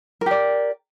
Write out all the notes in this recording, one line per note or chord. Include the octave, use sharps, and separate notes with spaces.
G4 A#4 D5